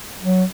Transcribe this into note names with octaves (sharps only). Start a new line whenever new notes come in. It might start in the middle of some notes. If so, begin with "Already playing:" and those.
F#3